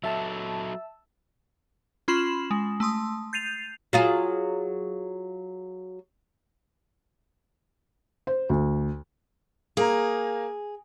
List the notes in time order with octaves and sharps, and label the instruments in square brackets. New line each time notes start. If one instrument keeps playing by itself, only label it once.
[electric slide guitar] F#3 A4 [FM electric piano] E5 A5 E6
[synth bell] C#4 F4 B5 C6 E7 F#7
G#3
A3 A5 C6 D#6
G6 A6 C7 D#7 F7
[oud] F#3 F4 G#4
[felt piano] C5
D2
[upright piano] A#3 A#5 [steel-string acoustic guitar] G#4